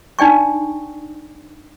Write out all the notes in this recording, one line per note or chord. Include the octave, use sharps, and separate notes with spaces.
D4 D#4 D5 G5 C#6